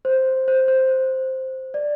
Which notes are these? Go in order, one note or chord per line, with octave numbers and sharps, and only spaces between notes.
C5
C5
C5
D5